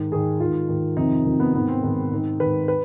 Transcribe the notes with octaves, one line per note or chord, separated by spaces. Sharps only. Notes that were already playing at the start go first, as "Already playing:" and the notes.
Already playing: G#2 D#3
G#2 D#3 G#4
G#2 D#3 F4
G#2 D#3
F2 C3 D#3 D#4
F2 C3 D#3
B3
G#2 D#3 B3
C4
G#2 D#3
G#2 D#3
G#2 D#3 B4
B4